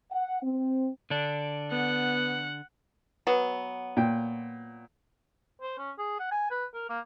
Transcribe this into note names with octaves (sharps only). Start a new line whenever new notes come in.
F#5
C4
D3 D4
B3 F#5
F#3 B3
A#2 G5
C5
C#4
G#4
F#5
G#5
B4
A#4
A#3